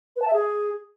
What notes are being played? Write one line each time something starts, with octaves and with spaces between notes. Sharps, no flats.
B4
A5
E5
G#4